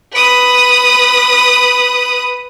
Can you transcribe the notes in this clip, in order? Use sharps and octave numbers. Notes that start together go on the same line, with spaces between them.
B4 D#6